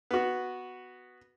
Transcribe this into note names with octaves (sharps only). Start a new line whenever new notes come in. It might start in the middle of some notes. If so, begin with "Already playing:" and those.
B3 F#4